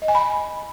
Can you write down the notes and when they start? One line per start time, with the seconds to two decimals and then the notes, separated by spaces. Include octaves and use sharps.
0.02 D#5
0.08 G#5
0.15 B5